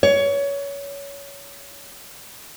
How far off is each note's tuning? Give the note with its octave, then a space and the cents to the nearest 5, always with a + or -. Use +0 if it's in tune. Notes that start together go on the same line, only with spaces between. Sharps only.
C#5 +20